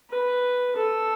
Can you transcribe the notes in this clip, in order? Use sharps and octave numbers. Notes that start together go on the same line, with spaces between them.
B4
A4